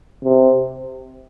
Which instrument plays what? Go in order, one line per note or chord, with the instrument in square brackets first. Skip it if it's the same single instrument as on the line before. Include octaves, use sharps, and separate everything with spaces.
[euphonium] C3